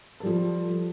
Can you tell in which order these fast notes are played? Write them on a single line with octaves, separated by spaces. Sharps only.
A4 G3 F3